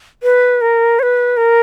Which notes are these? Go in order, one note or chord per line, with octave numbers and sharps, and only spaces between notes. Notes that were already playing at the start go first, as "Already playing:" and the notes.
B4
A#4
C#5
B4
A#4